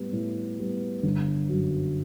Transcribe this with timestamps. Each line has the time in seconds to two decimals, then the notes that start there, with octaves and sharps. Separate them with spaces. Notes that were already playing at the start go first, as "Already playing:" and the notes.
Already playing: A2 G3 B3
0.13 A2
0.59 G3 B3
1.03 G1
1.49 F#2 F#3